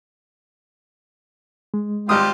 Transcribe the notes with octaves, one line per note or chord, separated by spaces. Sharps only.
G#3
G#1 G3 C4 F4 G4 D#6